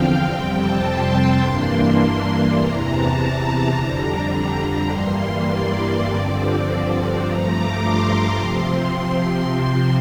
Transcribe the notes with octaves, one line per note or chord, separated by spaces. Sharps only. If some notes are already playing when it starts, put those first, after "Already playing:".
Already playing: E2 D3 F3 C4 F5 G5
F2 C3 G3 C4 G5
A5
C6
G2 E3 A#3 D4
C6
E2 C3 E3 A#5
A5
A#5
F2 D3 G3 D4
G2 E3 G3 A#3 C6
D5
G2 D3 F3 C4
G2 F3 A3 A#5
D6
C6
D6
C3 F3 C4 C6